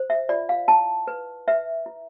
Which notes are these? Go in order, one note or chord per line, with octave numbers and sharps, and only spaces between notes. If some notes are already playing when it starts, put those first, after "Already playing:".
Already playing: C5
E5
F4 D5
F5
E4 A5
B4
B4 E5
E4